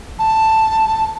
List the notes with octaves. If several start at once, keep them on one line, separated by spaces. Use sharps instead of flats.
A5